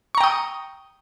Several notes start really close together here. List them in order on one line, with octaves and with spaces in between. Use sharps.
C#6 A#5 G5 D#6